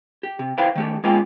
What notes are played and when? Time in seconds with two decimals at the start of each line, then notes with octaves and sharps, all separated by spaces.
0.23 G4
0.39 C3
0.58 E4 B4 C5 F5 G5
0.75 D#3 A3 G4
1.04 G#3 A#3 B3 C#4 F4 G5